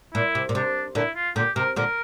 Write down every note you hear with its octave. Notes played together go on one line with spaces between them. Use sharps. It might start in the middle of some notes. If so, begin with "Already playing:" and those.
A#2 E4
C3
A#2
C3 D4
A#2 D3 E4
F4
A#2 D3 G4
C3 A#4
A#2 D3 A#4